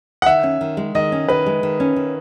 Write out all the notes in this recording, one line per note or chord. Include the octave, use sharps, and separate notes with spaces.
F#5
D#3 E5
C#4
D#3
G#3
D#3 D#5
C#4
D#3 B4
G#3
D#3
C#4
D#3